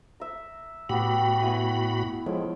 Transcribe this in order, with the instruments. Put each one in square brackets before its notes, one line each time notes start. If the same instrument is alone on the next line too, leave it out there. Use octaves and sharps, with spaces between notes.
[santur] E5 A#5
[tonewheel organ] A2 F#4 B5 [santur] B3 G4
[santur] B3 E4 G#5
[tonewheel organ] F3 G#3 [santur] A4 C#5 G5